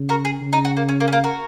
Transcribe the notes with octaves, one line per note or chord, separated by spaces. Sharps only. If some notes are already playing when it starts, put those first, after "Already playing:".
Already playing: C#3
F#4 A#4
G#4
C#3
D#4
F#4
A#3
C#4
A#3
C#4
A#3
F#4 A#4